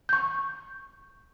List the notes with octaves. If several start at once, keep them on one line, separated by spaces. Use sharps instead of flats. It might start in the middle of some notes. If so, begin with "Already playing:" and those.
C#6 G6